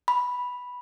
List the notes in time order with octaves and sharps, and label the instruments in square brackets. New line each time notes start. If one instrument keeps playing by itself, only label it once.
[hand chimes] B5